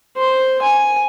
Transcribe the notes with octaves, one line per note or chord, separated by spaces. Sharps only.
C5
G#5